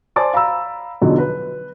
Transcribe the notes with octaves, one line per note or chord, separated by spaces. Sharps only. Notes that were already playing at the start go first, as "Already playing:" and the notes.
C5 D5 G#5 A5 D6 A6
F5 A#5 B5 E6
E2 B2 D3 F3 F#3 D#4
B4